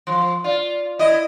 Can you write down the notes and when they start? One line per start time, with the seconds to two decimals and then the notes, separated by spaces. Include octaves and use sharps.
0.07 F3 C6
0.44 F4 D5
0.99 E4 D#5